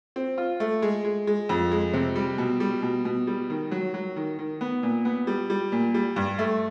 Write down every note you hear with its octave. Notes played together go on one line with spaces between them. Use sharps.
C4
F4
A3
G#3
G#3
G#3
F2
G#3
C3
G3
B2
G3
B2
B2
G3
D#3
F#3
F#3
D#3
D#3
B3
A#2
B3
G3
G3
A#2
G3
G2
A3